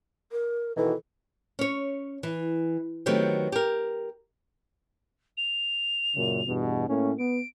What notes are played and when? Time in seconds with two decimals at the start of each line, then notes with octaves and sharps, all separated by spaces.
0.32 A#4
0.77 B2 D#3 E3 A4
1.59 C#4 C#5
2.23 E3
3.06 D#3 F#3 A3 B3 C4 G4
3.52 G4 A#4
5.37 F7
6.15 F#2 A#2 C#3
6.47 E2 G2 B2
6.88 A2 A#3 C#4
7.19 B3 D7